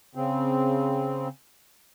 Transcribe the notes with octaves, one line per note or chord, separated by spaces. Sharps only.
C#3 C4